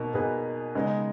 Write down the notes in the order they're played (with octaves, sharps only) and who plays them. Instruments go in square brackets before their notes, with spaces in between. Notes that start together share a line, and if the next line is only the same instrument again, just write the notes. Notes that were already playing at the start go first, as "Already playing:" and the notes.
Already playing: [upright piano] B2 A#3 D#4
B2 A#3 D#4 G#4 B4
C#3 G#3 B3 D#4